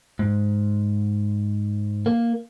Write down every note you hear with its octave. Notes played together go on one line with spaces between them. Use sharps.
G#2
A#3